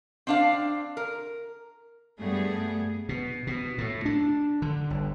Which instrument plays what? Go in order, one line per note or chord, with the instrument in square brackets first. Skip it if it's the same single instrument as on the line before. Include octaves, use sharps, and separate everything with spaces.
[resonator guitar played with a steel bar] C4 D4 F5
A#4
[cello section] G2 G3 A3 B3 G#4
[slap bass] B2
B2
A2
D4
D3
G1